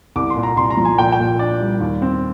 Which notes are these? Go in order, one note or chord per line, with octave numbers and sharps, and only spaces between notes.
C2 D6
C6
A#2
A#5
C2 C6
A#5
F3
G#5
A#2 G5
G5
A#2
D4 D5
G3
D#2
C4